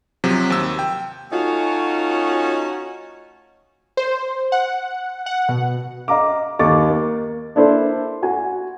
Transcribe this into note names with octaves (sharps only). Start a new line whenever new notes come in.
C3 F3 F#3
D#2 E6
G5
A3 C#4 D#4 F4 F#4
C5
F#5
F#5
B2
D#5 F5 A#5 D6
D#2 D#5 C#6 D6 A6
A#3
A#3 D4 E4 A4 C5 E5
F#4 G#5